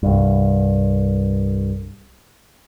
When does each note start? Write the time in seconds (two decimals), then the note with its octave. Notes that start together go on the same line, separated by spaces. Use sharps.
0.03 C2 G2